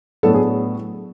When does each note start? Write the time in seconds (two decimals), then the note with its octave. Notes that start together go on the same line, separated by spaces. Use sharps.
0.23 A2 F#3 B3 D4 A4
0.34 G#4